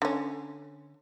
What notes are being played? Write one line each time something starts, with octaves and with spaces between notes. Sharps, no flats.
D3 C#4